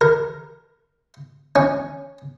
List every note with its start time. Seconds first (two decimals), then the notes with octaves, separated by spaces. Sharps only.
0.01 A#4
1.56 C#4